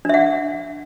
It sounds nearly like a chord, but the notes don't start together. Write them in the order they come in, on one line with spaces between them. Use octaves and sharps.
D4 E5 F#5